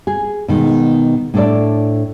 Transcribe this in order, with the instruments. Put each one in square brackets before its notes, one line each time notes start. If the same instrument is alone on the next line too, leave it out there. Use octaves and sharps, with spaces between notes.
[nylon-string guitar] G#4
B2 D#3 G#3
A2 D4 A4 D5